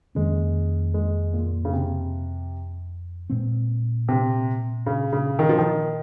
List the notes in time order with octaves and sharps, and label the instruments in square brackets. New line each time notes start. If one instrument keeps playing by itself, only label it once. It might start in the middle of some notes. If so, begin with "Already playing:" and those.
[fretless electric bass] F2 D#3 A#3 C#4 [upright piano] G#3
[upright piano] G#3
A#2
C#3
C3
[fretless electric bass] A#2 G#3 C4
[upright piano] C3
C#3
C#3
D#3
F3
D#3